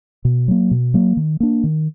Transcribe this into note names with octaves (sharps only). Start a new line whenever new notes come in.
B2
F#3 A#3
B2
F#3 A#3
D#3
A#3 D4
D#3